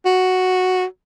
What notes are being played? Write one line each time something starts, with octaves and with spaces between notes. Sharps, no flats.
F#4